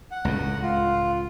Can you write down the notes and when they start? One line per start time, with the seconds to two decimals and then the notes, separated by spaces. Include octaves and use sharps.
0.11 F#5
0.25 C#2 A2
0.62 F4